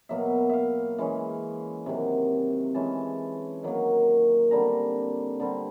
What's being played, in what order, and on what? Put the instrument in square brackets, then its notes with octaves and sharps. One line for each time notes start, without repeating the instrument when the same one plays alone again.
[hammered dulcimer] B2 F#3 A#3 E5
E5 F5
E3 G#3 C#4
C3 D#3 F#3
E3 G#3 C#4 A5
D#3 F#3 A#3
D3 G3 C4 A#5
D3 G3 C4